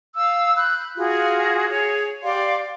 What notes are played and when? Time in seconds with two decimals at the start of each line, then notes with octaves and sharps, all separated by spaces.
0.16 F5 E6
0.56 B5 F#6 G6
0.97 F4 F#4 G#4
1.69 G#4 C#5
2.23 G4 D5 F5 C6